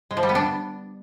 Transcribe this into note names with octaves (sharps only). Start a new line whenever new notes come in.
G#3
F3
G3
B3
D4